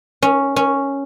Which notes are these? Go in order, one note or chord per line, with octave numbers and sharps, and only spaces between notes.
C#4
C#4